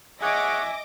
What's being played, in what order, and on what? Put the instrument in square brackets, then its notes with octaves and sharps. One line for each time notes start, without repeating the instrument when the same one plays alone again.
[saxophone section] G#4 C#5 F#5 [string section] D#5 D6 A#6 [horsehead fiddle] E5 G#5